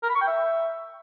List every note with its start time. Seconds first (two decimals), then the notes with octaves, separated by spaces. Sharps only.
0.03 A#4
0.09 B5
0.15 C#6
0.21 G5
0.28 E5